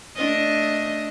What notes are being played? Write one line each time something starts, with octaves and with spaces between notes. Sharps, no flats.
A3 D4 D#5